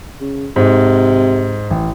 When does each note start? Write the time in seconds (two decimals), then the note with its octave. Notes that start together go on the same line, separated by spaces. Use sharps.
0.21 C#3
0.56 G#2 C3
1.71 A1